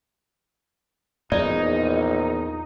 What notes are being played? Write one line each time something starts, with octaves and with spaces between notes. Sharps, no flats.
A#1 E2 D#4 D5